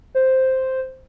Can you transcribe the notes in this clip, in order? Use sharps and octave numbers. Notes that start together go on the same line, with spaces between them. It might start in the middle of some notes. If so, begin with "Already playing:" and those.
C5